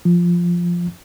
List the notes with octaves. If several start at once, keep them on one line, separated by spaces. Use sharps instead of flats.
F3